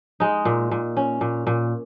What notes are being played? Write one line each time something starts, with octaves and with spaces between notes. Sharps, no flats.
G#3 D#4
A#2
A#2
C#4
A#2
A#2